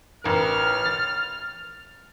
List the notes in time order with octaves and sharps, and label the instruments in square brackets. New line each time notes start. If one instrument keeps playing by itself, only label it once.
[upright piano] A1 A#4 [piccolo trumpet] F6
[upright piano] A6